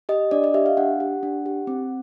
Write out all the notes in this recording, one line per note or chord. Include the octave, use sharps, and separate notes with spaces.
G4 D#5
D4 D5
D#5
G4 E5
F5
D4 F#5
G4
D4
G4
C4